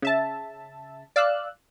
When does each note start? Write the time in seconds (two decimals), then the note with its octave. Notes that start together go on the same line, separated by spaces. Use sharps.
0.02 C#3 E5 A5
1.16 D5 F5 E6 F#6